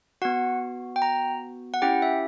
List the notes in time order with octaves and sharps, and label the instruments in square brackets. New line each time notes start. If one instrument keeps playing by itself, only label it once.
[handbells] B3 F#4 F#5
G5
A#5
F#5
C#4 E4 G4 G5
E5